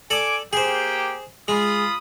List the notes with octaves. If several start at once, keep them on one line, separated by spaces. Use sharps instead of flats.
A4 D5 G#5 D6 D#6
A#3 G4 G#4 C5
G#3 F4 B5 D#6